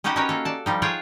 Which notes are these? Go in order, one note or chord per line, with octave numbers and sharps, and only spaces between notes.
C#4 D#4 F#4 G4 B4 D#5
C#4 D#4 A#4 B4 C#5
A#3 A4
D5 A5
F3 G3 D#4
F4 G#4 C#5 F#5 G5